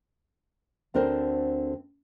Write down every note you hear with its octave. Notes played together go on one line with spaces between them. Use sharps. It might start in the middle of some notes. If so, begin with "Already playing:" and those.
D2 D3 C4 D4 A#4 C5